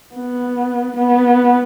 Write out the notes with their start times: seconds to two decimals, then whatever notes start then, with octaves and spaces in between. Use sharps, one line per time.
0.15 B3
0.97 B3